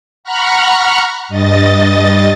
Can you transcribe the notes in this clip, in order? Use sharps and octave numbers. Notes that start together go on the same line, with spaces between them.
F#5 A#5 B5 C#6 F6 F#6
G2 D#5 A6